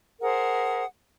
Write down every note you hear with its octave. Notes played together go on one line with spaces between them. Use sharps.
G#4 A#4 C5 F#5